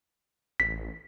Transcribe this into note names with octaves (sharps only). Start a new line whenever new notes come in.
A1 B6